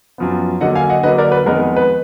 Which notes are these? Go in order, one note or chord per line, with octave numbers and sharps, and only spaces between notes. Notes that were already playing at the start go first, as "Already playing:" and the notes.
F#2 F3 B3
D3 F#3 A#3 D#5 F#5
F5 G#5
D#5 F#5
D3 F#3 A#3 B4 D#5
A#4 D5
B4
F2 D#3 G#3 B3 A#4
B4